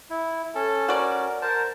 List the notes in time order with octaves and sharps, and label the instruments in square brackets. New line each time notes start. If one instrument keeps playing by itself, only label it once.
[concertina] E4
[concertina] C#4 [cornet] A4
[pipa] F#4 D5 [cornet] A#4
[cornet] A#4 [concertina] C5 A5